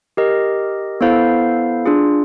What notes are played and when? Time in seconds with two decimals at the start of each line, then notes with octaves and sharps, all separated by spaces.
0.17 G4 A#4 D#5
1.01 B3 E4 A4 C5 F5
1.86 D4 F4 G#4